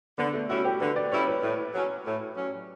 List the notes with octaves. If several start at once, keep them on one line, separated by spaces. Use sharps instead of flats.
D3 B3
A3
G3 C#4 E4 F#4
G4
D3 B4
D5
G3 C#4 E4 C#5
B4
A2
F#3 C#4
A2
F#3 C#4